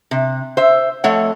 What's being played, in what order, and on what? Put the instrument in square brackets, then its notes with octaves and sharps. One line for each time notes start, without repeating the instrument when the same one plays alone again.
[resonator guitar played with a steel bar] C3
C5 E5
F2 A3 A4 C#5 D#5 F#5